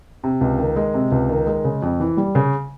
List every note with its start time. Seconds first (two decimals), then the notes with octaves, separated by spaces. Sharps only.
0.24 C3
0.41 C#2
0.59 D#3
0.76 G#3
0.94 C3
1.12 C#2
1.29 D#3
1.47 G#3
1.64 C#3
1.82 F2
2.00 E3
2.17 G3
2.35 C#3